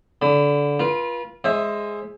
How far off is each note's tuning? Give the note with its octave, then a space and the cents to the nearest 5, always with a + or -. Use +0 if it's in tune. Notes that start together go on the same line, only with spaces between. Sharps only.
D3 -20 B5 +30
F4 -10 B4 -35
G#3 +0 C5 +30 E5 +0